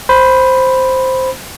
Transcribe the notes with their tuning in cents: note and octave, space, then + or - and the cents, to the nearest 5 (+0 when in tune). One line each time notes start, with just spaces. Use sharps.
C5 +0 B5 +0